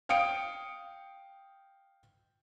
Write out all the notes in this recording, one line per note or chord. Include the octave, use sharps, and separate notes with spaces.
F5 G5 D#6 C#7 D7